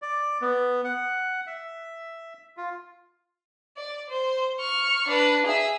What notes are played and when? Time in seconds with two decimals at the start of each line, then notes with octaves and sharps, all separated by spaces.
0.02 D5
0.42 B3
0.84 F#5
1.47 E5
2.57 F4
3.76 D5
4.09 C5
4.60 C#6 F6
5.08 D4 B4
5.46 G#4 E5